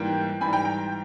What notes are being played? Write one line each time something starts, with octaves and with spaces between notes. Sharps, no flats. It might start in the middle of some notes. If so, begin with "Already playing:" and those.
Already playing: G#2 E3 G3 A#3 G5
G#2 E3 G3 G#5 B5
G5 A#5
G5 A#5